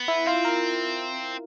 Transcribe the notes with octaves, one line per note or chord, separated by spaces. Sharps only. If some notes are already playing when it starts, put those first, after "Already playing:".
Already playing: B3
E4
C4 F4
A#4